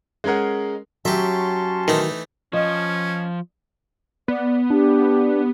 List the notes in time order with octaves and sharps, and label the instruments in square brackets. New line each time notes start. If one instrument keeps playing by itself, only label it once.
[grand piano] G#3 C#4 G#4 A#4 F#5
[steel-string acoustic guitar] F#3 [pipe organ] C#4 A5 C6 [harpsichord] G4 E5
[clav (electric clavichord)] D#3 [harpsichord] E3 A3 D#4
[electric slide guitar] F3 [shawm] C#4 [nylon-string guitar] D#5
[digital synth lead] B3 [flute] D5
[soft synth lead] D4 [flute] G4